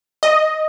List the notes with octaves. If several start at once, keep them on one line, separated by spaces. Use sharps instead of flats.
D#5